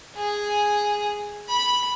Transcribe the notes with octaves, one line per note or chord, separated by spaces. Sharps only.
G#4
B5